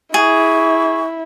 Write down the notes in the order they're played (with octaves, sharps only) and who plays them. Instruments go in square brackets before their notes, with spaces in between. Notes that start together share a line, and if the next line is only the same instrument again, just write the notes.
[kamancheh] E4 [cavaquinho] G#4 [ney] C#6